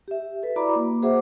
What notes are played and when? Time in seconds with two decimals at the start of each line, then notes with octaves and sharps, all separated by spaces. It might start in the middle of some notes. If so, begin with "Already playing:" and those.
0.08 G4 E5
0.43 A4 B4
0.56 E4 F#4 D5 A#5 B5 D6
0.76 A#3
1.02 F#4 G#4 C5 E5 F#5 D6